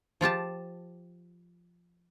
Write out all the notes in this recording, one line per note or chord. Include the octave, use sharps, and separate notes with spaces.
F3 F4 G4 A5